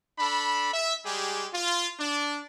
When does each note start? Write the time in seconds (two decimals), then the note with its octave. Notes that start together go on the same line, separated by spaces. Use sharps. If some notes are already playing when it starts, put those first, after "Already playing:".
0.19 D4 A4 B5
0.74 E5
1.06 G3 G#3 G4 G#4
1.54 F4
2.00 D4